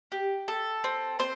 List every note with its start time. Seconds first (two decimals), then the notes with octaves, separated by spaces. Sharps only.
0.12 G4
0.48 A4
0.84 C4
1.19 C4 C5